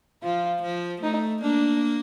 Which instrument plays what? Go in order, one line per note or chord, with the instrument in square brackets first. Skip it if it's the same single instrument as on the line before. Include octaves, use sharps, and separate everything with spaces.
[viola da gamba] F3 [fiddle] F4
[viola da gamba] F3
[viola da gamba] A3 [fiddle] D#4
[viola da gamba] A#3 [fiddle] D4